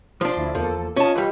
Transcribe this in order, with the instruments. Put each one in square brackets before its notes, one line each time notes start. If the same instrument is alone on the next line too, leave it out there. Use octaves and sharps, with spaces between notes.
[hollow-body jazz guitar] F3 D4 [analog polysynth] C6
[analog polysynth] D2 E4
[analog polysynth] E2 A#3 A4 [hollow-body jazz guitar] F3
[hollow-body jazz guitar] C#4 A5 [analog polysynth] F4 D#5
[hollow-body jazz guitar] E3 G3